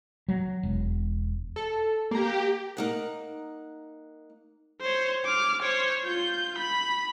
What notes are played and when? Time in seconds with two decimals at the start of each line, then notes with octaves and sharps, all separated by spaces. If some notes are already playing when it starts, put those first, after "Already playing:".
0.28 F#3
0.63 E1
1.56 A4
2.11 A#3 G4 A#5
2.77 A#3 D#4 F#5
4.81 C5 C#5
5.25 D6 F6
5.62 C5 C#5
6.05 F4 G6
6.58 B5